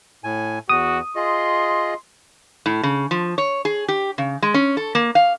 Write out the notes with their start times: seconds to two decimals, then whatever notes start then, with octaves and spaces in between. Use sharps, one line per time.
0.24 A2 G#5
0.69 E2 F#4 D#6
1.16 F4 G#4 D#5 C6
2.66 A2
2.83 C#3
3.11 F3
3.38 C#5
3.65 G#4
3.88 G4
4.18 C#3
4.42 G#3
4.54 C#4
4.77 A4
4.95 A#3
5.15 F5